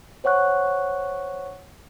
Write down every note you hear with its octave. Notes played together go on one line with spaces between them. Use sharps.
C5 C#5 F#5 C#6 F#6